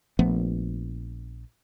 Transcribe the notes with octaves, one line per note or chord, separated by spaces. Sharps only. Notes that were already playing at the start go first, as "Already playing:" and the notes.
A#1 F3 A3 B3